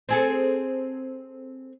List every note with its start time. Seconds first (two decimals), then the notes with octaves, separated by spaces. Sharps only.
0.09 C4 G#4 A4